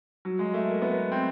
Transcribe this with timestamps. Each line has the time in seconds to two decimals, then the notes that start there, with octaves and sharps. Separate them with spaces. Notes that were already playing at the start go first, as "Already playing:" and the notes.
0.25 F#3
0.39 G#3
0.54 A3
0.68 A#3
0.82 B3
1.12 C4